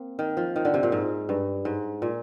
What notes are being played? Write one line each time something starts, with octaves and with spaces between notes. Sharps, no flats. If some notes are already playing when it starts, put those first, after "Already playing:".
Already playing: A#3 C4
D#3
F3
D#3
D3
C3
A#2
G#2
G2
G#2
A#2